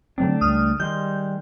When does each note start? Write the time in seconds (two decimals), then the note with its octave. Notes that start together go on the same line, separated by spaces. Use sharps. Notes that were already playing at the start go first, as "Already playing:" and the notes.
0.18 D3 F#3 A3 C4 D4
0.41 C#2 C#3 G3 D#6 F6
0.80 D#3 G3 G#3 C6 G6